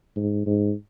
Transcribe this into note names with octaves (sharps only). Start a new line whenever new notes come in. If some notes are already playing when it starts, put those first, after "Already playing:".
G#2
G#2